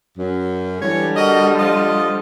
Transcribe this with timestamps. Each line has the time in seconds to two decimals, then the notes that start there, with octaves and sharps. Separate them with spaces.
0.18 F#2
0.82 D3 E3 G3 C#5
1.16 F#4 A#4 D#5
1.58 F3 F4 D#5